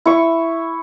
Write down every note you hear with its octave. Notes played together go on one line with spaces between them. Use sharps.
E4 C#6